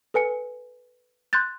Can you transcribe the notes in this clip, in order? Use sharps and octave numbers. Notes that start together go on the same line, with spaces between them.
A4 B4 G#5 C#7
C6 F#6 G6 A6